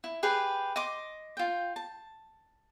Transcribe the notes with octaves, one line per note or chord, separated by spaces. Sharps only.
E4
G4 G#4 B4 G5
D#5 C6 D6
F4 G5
A5